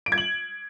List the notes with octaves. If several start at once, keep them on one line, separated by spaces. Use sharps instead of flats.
D7
G#6
F#7